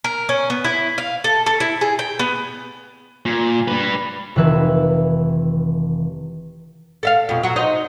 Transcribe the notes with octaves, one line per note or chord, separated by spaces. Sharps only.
A#4
C#4
B3
E4
F5
A4
A4
E4
G#4
G5
B3
A#2
G3 B4
F1 D#3 E3 B4 E5 G#5
A4 E5 F5
F2 B2
F#3 F#4
D#4 C5 D#5